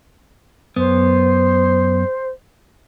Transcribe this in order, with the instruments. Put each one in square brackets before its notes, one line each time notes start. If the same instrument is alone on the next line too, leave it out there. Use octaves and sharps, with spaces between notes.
[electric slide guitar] F#2 B3 [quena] C5